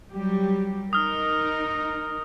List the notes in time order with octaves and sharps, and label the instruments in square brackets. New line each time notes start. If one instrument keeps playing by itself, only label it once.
[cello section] F#3 G3 G4
[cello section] D#4 A#4 [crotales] D#6 F6